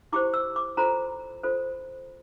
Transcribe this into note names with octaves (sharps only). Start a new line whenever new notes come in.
E4 G4 C5 D6
E6
D6
F4 A4 C5 A#5
F4 A4 C5